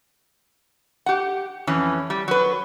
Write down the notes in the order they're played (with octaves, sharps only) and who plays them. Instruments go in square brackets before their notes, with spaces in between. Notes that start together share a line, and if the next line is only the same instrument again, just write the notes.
[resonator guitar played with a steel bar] G4 F#5
F2 E3 C#4
G3
F#3 B4